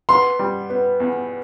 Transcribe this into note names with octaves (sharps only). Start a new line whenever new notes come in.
B3 C6
G3
B3
E2